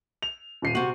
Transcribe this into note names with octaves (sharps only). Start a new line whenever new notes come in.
F7
D#1 C7 D#7
C3 F#4 F#7